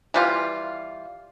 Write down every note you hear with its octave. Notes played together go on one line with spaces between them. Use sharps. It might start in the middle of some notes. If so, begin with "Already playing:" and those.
E3 G3 F4